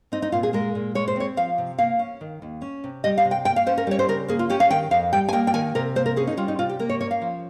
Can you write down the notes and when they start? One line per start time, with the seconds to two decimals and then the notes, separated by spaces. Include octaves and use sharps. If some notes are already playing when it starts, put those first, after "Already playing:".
0.12 C4 D#4
0.22 D#4
0.32 A#2 F4
0.43 G#4
0.53 G#3 A#4
0.75 A#2
0.95 G#3 C#5
1.08 C5
1.16 C4 C#5
1.37 F3 F5
1.58 C3
1.78 A#3 F5
1.99 C#4
2.21 D#3
2.42 D#2
2.62 C#4
2.84 C3
3.04 G3 D#5
3.18 F5
3.25 C3
3.31 G5
3.45 A#3 G5
3.56 F5
3.66 C#4 C5
3.78 A#4
3.87 G3 C#5
3.99 C5
4.09 C#3 A#4
4.28 A#3 G#4
4.39 F4
4.50 C#4 G4
4.60 F5
4.71 D#3 G5
4.91 F2 F5
5.13 G3 G5
5.29 G#5
5.33 A#3 G5
5.47 G5
5.54 D#3 G#5
5.75 C3 A#4
5.96 A#3 C5
6.06 A#4
6.16 C#4 G#4
6.27 D#4
6.37 G3 F4
6.48 D#4
6.59 C3 F4
6.69 G4
6.79 A#3 A#4
6.89 C#5
7.01 C#4 C#5
7.11 F5
7.22 F3